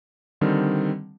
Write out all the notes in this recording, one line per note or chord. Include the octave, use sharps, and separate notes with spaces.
D3 D#3 G3 C4